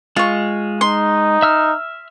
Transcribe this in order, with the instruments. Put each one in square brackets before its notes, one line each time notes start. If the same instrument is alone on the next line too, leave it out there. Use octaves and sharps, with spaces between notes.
[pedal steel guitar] G#3 [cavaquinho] F4 C#6
[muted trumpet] D#4 [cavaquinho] C6
[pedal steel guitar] E5 E6 F6